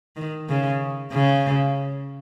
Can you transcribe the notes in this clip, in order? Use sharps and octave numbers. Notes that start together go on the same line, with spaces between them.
D#3
C#3
C#3